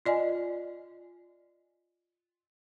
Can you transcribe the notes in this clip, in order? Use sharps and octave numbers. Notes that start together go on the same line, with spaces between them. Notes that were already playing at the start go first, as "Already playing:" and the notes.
F4 D5 D#5 G#5